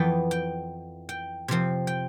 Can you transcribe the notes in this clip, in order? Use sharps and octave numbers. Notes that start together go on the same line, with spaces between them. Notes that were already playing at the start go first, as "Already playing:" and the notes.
Already playing: F2 E3 B3 G5 A5
G5
G5
C3 F3 C4
G5